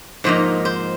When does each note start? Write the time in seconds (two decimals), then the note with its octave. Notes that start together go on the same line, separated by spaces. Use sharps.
0.24 G#2 F3 A#3 D#4 C5
0.65 C5